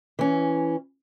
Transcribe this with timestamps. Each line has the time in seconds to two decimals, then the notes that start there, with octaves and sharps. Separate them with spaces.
0.19 E3 C#4